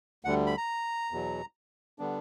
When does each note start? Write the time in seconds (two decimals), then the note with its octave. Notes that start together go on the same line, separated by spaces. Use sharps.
0.25 D2 D3 G3 F#5
0.46 B5
0.57 A#5
1.11 E2 B2 F#3
1.99 D3 G3 B3 D4